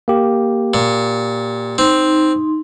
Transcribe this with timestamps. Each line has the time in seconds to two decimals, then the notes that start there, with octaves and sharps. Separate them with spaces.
0.08 A#3 G4
0.74 A#2
1.78 C4 D#4 C6